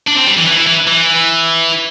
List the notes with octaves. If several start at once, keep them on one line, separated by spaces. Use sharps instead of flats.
D4
C4
G3
E3
E3
E4
E3
E3